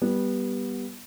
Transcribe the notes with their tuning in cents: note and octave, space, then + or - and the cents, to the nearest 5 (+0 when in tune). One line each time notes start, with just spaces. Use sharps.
G3 +0 B3 -15